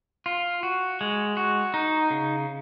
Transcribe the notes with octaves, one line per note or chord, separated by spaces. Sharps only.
F4
F#4
G#3
F#4
D#4
C#3